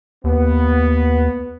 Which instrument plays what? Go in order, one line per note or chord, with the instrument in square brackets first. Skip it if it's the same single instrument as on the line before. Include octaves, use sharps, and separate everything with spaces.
[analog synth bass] D#2 [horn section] B3